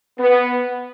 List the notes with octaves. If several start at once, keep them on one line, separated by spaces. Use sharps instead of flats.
B3